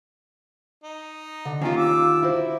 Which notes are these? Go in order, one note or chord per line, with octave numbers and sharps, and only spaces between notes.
D#4
D3
D#2 D#3 C#4 F4 A#5
D6 E6
E4 F#4 C5